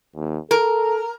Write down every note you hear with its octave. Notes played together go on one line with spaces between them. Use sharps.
D#2
A4 A#4